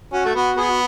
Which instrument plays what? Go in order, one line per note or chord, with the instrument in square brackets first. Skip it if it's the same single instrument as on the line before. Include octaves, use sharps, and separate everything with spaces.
[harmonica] C#4 [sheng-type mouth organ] F#4
[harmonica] A3
[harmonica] B3 [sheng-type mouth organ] F#4
[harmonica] B3 [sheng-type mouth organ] G#4
[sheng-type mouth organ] F#4